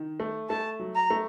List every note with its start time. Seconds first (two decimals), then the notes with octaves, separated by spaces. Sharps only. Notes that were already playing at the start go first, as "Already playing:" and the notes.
Already playing: D#3
0.20 A3
0.49 A3 A5
0.79 F#3
0.95 A#5
1.10 A3